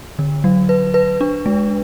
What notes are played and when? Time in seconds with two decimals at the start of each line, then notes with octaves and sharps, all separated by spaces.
0.19 D3
0.44 F#3
0.69 B4
0.94 B4
1.21 D4
1.46 G#3